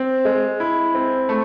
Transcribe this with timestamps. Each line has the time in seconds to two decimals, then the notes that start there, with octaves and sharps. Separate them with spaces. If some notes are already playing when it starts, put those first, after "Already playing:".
Already playing: C4
0.25 G#3
0.60 E4
0.95 C4
1.29 A3